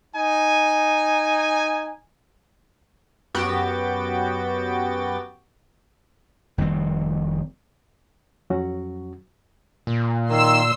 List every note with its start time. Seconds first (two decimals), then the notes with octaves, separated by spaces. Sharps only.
0.15 D#4 G#5
3.34 F#2 B3 F#4 G4 G5 A6
6.58 F1 D#3 G3 C4
8.50 F2 F#3 C#4 F#4
9.87 A#2
10.30 D#3 A#3 C6 E6